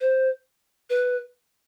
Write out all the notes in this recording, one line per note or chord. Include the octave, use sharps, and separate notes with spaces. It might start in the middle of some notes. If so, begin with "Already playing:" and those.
C5
B4